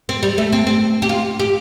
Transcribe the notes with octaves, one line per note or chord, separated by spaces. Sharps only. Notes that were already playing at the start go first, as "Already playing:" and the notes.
C4
G3
A3
C4
C4
G4
F4
G4